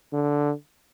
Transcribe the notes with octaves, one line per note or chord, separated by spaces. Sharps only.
D3